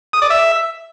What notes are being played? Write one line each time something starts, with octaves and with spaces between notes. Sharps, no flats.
D#6
D5
E5